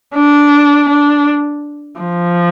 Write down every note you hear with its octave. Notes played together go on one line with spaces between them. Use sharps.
D4
D4
F3